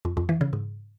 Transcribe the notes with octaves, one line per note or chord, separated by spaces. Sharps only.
F2
F2
E3
C#3
G#2